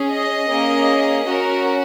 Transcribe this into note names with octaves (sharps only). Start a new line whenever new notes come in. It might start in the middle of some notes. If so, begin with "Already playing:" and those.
Already playing: C#4 G#4
D#5
A#3 C#4 G#4
C#4 F#4 A#4